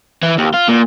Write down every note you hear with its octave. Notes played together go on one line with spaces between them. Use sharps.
E3
D#2
F4
A#2